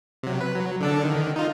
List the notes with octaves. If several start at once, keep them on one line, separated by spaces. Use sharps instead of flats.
C3 F#3
B4
F#3
D3 D4 A4
D3 D#3
D#4 F4